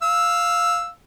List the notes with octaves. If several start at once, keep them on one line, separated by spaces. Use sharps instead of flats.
F5 E6